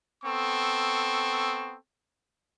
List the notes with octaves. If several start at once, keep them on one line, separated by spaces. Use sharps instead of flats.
B3 C4 A4 C#6